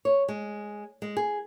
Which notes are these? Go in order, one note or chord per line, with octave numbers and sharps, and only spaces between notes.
C#5
G#3
G#3
G#4